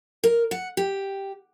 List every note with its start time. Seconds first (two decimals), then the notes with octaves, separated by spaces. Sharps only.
0.24 A#4
0.51 F#5
0.77 G4